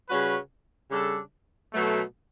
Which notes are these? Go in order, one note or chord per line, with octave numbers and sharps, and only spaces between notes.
C#3 G3 C#4 F#4 B4
C#3 G3 D4 A4
B2 F#3 A3